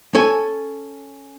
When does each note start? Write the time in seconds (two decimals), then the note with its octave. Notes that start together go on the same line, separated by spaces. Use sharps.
0.15 C#4 A4 G#5